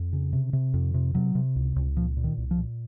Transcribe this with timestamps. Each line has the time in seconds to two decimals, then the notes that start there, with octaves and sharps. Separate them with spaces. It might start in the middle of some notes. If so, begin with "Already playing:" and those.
Already playing: F2
0.13 C#3
0.33 C3
0.53 C3
0.74 F2
0.94 C3
1.15 C3 F#3
1.35 C3
1.56 C#2
1.76 C#2
1.96 A#2 F3
2.17 A#2
2.24 D#3
2.38 C2
2.51 F3
2.58 A#2